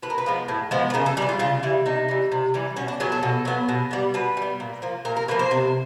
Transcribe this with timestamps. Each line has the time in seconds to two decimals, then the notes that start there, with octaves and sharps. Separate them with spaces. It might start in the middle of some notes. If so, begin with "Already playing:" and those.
0.02 A2 B4
0.10 A#4
0.18 B4
0.26 F3 G#3 B3
0.48 A2
0.71 F3 G#3 B3
0.90 B4
0.94 C#3 A#4
1.06 A4
1.17 G3 G4
1.22 E3
1.29 F4
1.39 C#3 F4
1.63 E3 G3 E4
1.86 C3 D#4
2.08 E3 G3
2.32 C3
2.54 E3 G3
2.76 B2 C#4
2.88 D4
3.00 F#3 B3 G#4
3.12 A4
3.23 B2
3.45 F#3 B3
3.69 B2
3.91 G3 B3
4.14 B2 B4
4.37 G3 B3
4.60 A#2
4.82 F3 A#3
5.05 A#2 A#4
5.17 A#4
5.28 F3 A#3 B4
5.39 C5
5.51 C3